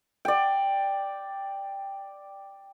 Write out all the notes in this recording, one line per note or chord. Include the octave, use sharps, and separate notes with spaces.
D5 G5